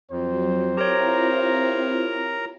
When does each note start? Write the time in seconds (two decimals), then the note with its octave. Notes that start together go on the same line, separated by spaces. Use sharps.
0.11 F2 F#3 C5
0.77 C4 E4 F4 G4 A#4 C#5 A#5